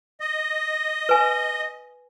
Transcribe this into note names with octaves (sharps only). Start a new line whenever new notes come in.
D#5
B4 G#5